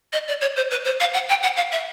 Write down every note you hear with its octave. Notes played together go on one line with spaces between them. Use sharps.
D#5
D5
C#5
C5
B4
C5
F5
F#5
G5
F#5
F5
E5